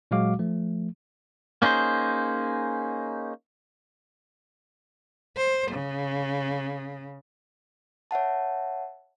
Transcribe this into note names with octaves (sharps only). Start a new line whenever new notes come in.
A#2 F#3 G#3 F#4 F5 D6
F3 A3
A#3 C#4 D#4 G#4 C5
C5
C#3
C#5 E5 F#5 A5